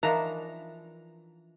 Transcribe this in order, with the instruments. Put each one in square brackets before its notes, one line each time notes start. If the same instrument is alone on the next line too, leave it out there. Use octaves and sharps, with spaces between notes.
[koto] E3 F3 D4 [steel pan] D#4 E5 A5 [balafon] A#4 [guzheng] A#5